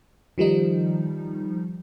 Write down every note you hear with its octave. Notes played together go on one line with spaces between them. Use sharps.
D#3 F3 G3 D#4